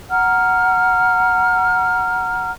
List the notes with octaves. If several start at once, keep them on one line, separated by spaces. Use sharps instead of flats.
F#5 A#5 F6